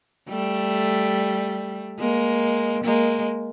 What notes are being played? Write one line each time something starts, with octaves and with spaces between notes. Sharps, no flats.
G3 A3
G#3 A#3
G#3 A#3